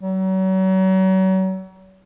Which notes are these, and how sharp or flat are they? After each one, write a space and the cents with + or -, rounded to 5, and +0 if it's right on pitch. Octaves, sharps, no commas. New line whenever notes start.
F#3 +35